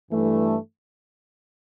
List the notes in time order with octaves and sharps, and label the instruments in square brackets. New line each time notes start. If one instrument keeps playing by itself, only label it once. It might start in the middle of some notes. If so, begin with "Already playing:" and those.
[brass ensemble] G2 E3 A3